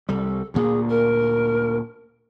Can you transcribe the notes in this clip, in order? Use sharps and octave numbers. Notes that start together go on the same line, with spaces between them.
C2 G3 A4
D2 A#2 A#3 G#4
A#4